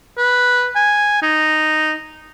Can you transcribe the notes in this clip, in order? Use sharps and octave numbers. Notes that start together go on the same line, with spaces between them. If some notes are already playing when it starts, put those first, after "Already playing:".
B4
G#5
D#4